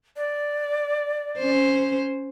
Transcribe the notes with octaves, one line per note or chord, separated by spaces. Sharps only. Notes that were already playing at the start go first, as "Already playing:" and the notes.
D5
C#4 C5